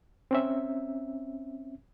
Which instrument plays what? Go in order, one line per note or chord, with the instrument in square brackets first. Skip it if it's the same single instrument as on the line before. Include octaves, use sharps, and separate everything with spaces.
[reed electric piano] C4 C#4 E5